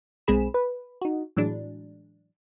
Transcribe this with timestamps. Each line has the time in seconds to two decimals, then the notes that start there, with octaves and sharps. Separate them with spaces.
0.27 B1 G#3 C4 G#4 B5 E7
0.54 B4
1.02 D#4 F#4
1.36 A2 E3 F#3 G#3 D4